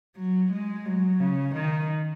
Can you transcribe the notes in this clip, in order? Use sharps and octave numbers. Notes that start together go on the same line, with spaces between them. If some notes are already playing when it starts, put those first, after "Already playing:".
F#3
G#3
F#3
C#3
D#3